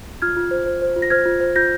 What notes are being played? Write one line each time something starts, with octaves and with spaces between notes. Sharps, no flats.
F4 F6 G#6
F4
C5
C5
C5
F4
A#6
C5 F6 G#6
F4
C5
F4 G6 A#6